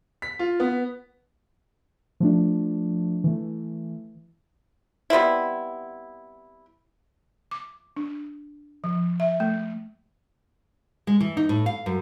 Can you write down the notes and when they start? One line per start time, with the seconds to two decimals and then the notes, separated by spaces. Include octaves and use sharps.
0.22 B6
0.39 F4
0.60 B3
2.20 F3 A3 D4
3.24 E3 A3
5.10 G3 B3 C4 E4
7.51 D6
7.97 D4
8.84 F3
9.20 E5
9.40 A3
11.07 G#3
11.20 E3
11.37 D#4
11.49 A2
11.66 F5
11.86 F#2